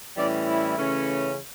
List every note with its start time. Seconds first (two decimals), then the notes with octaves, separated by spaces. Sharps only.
0.16 A2 E3 G3 C#4 D5
0.46 E4
0.76 C#3 E3 A3 C#4